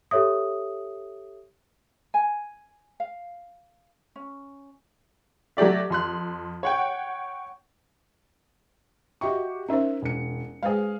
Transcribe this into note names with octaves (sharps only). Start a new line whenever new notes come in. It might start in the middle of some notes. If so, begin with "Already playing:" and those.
G4 A4 C#5 E5 D#6
G#5
F5
C#4
F#3 A3 G4 D5 E5
F2 C6 F#6
C#5 F#5 G5
F#4 G4 D#5 E5 G5 C#6
C#4 D#4 A#4 C5 E5
E1 C#7
G#3 G#4 B4 C5 F5